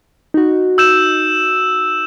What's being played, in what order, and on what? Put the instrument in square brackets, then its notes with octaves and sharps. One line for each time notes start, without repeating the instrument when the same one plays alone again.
[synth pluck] D#4 F#4
[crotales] E6 G6 E7